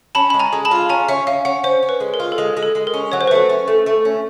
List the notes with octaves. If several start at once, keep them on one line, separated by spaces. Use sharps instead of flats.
C#4 A5 B5
G#3 B5
G#5 A#5
G#3
A5 B5
F4
C#4 G#5 A#5
C#4 E5
C#4 F5
C#4 F#5
C#4 C5
C#4
B4
G#3
A#4
F4
A4
G#3 G#4
G#3
A4
G#3
A#4
C#4
F#3 C#5
C5
B4
A3 C5
C#4
A3
A3
C#4